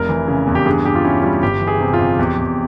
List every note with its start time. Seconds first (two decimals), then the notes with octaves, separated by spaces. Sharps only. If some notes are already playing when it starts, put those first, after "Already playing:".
Already playing: F1 A#4
0.09 E3
0.28 C#3
0.47 E2
0.55 G4
0.66 G2 G#4
0.85 G2 G4
0.95 F4
1.04 C#4 E4
1.23 G3 F4
1.43 G1 G4
1.61 E3
1.67 G#4
1.81 C3
1.93 F4
1.99 F2
2.19 E2 G4
2.38 E2